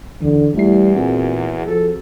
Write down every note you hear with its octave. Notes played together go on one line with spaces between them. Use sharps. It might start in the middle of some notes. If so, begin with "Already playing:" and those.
D#2 D3 E3
E2 G3 A3 E4 C7
A#2 C4 F#4 G#4
F3 A4